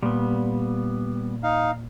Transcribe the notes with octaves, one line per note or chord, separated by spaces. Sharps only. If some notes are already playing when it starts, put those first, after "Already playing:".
A#2 G3 B3
D#4 F5